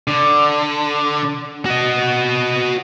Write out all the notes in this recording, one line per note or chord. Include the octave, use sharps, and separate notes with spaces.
D3
F#4 D#5